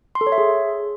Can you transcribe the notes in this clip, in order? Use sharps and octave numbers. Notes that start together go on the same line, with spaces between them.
C6
A4
C#5
E5
G#4